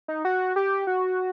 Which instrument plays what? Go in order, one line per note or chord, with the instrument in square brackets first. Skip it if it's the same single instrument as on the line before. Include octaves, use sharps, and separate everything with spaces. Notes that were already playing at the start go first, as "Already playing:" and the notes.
[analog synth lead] D#4
F#4
G4
F#4